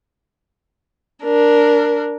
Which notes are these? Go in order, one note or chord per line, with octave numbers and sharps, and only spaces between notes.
D4 A#4